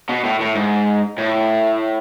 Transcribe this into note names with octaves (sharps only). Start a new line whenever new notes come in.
B2
A2
A2
G#2
A2